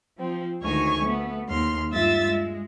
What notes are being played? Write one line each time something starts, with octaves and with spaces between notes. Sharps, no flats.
F3 C4
D2 D#3 G#3 C#5 G#5 C#6
A3 B3
D#2 C6 F6
G2 G#3 F4 E5 E6 A6
G#3